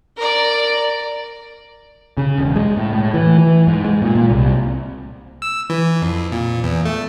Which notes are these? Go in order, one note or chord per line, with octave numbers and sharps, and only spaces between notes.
A#4 D5
C#3
E1
G#3
A2
A2
E3
E3
G#2
G#3
A#2
A#2
C2
E6
E3
F2
A#2
E2
A3